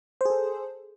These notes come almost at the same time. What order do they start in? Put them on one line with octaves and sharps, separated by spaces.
C5 G#4 A4